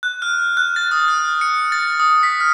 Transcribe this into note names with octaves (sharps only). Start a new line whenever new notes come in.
F#6
F6
F#6
A6
D#6
F6
C#7
A6
D#6
B6
F6